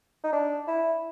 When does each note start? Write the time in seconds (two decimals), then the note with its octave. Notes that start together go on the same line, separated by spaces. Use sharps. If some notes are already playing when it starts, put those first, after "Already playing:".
0.24 D#4
0.33 D4
0.68 E4